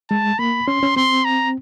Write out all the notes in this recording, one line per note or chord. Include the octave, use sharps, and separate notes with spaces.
G#3 A5
A#3 B5
C#4 C6
C#4
C4 C6
A#5